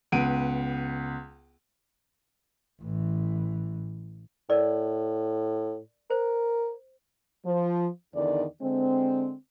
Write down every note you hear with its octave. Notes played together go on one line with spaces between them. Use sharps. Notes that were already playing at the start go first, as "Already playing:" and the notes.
C#2 B3 F#5 D7 D#7
A1 E3
A2 A#4 D5
A#4 C5
F3
E2 D3 D#3 D5
D3 G#3 C4